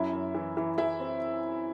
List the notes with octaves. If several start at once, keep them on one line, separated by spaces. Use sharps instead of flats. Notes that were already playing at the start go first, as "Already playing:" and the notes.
Already playing: F#2 E4 E5
F#2
E3
E3
E3 E4 E5
C4